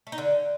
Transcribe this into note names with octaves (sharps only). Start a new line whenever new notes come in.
A3
D#4
D3